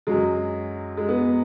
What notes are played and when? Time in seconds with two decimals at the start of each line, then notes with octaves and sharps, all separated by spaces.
0.07 F#2 F#3 G#3
0.97 G#3
1.09 B3